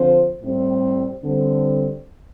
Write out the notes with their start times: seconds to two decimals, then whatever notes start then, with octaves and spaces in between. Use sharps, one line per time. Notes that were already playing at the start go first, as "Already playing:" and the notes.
Already playing: D3 F3 C4 F4 C5
0.43 A2 G3 C4
1.24 D3 G3 C4